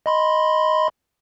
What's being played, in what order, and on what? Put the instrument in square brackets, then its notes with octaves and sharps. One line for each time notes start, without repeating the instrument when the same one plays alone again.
[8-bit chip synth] D#5 B5 C6